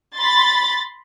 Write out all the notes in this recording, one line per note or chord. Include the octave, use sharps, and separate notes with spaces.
B5 C6 A6